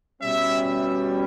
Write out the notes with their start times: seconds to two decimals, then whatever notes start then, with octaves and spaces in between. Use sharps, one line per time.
0.22 B2 G3 C#4 E5